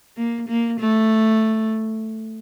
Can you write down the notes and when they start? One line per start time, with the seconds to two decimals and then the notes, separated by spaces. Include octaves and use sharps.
0.17 A#3
0.48 A#3
0.80 A3